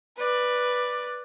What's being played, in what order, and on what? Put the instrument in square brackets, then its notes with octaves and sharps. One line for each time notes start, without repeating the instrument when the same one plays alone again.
[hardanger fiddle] B4 D5